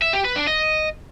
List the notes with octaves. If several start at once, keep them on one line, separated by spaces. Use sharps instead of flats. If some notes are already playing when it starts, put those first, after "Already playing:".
E5
G4
B4
D4
D#5